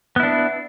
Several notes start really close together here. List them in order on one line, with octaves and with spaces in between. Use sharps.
B3 E4 D4